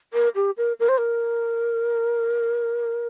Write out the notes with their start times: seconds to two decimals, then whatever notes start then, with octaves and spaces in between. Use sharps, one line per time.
0.13 A#4
0.35 G4
0.57 A#4
0.80 A#4
0.89 C5
0.98 A#4